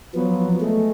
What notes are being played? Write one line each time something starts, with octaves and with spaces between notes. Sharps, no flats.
F3 F#3 B3
G#3 A3